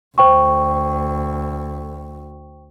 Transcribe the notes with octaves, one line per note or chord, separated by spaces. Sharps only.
D2 C5 G5 C#6